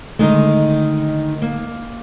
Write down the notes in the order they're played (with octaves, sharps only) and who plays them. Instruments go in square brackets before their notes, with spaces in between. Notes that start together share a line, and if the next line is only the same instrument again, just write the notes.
[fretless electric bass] D3 A3 [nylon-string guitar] D#3 G#3 D#4
[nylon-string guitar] A#3